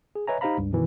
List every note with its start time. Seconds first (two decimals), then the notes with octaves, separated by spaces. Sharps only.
0.15 G#4
0.28 B4 C#5 D#5 E5 G#5 A#5
0.41 D#4 G4 C5 F5 A#5 B5
0.57 C#2 G2
0.72 F#2 B2 D#3 E3